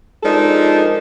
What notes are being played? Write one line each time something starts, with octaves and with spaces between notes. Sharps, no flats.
F3 G#3 D4 D#4 A4 A#4